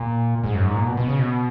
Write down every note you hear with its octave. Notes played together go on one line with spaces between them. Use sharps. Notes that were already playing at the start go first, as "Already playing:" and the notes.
Already playing: A#2
G#2
F#2
G#2
A#2
B2
B2
C#3
B2